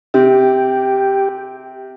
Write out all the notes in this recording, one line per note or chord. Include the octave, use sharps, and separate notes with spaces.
C3 G4